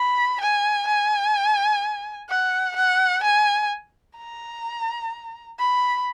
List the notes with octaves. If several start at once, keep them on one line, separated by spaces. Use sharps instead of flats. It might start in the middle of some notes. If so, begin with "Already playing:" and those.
Already playing: B5
G#5
G#5
F#5
F#5
G#5
A#5
B5